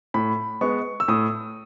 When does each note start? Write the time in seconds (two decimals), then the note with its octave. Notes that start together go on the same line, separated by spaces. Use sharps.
0.14 A2 B5
0.61 G#3 B3 C#6
1.00 E6
1.08 A2 D#6